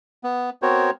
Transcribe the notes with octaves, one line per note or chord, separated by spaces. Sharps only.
B3
B3 C4 F#4 A#4 C5 C#5